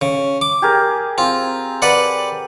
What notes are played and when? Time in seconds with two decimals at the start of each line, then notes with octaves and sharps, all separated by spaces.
0.01 C#3
0.41 D6
0.62 G4 G#4 A#4
1.18 C4 F4
1.82 B4 D5 F#5